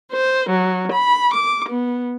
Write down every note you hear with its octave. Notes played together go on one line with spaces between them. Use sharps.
C5
F#3
B5
D6
B3